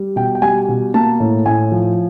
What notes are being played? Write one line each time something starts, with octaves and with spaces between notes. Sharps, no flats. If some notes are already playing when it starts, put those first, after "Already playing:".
Already playing: G3
B2 G5
G5
G3 G#5
B2
A#3 A5
A2
A2 G#5
F3